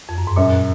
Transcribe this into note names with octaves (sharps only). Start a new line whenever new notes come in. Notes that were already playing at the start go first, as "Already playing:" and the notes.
F2
F#2
G#2
F#2 A#2